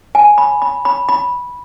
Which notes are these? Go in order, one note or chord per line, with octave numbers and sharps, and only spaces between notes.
G#5
B5
B5
B5
B5